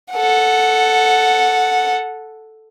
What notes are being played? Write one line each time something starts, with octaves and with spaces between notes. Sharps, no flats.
A4 F#5